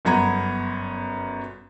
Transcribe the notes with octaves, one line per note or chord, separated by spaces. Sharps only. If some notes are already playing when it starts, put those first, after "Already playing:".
G1 F#2 B3 A#5 G#6